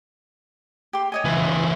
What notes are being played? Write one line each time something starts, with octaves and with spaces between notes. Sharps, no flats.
G4 C6
C#5 D#5 G#5
C#2 E3